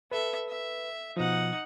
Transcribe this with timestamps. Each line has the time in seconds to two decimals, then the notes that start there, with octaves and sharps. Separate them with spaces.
0.12 A4 B4 E5
0.49 E5
1.17 B2 F3 D#4 F#5